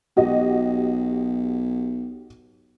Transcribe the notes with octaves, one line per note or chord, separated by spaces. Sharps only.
B1 F#4 G4 D#5